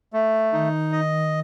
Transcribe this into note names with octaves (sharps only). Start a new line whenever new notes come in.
A3
D#3 D#4
D#5